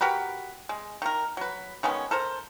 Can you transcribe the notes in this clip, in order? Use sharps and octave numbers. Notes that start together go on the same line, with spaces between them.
F#4 G4 A#4 B4
G#3
D#3 A#4
F#3 B4
D#3 G#3 B3 C#4
A4 A#4 C5